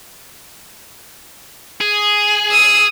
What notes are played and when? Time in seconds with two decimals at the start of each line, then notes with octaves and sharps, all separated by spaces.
1.81 G#4
2.51 D#6 E6